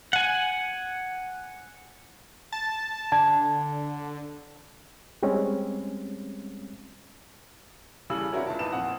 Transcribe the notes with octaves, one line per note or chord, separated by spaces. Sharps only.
F#5 G#5
A5
D3 A5 G#6
G3 G#3 C4 C#4
E2 C#3 G3 A4 E6 F#7
C4 D4 E4 F#4 A#4 C#5
C#2 E5 A5
E2 D#4 B4 F5 A5 E7
F2 A#2 C4 F5 F#5 D#6